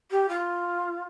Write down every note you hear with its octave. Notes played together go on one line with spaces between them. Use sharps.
G4
F4